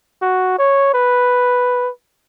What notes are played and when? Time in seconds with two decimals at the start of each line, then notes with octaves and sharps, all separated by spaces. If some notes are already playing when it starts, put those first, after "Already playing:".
0.22 F#4
0.58 C#5
0.94 B4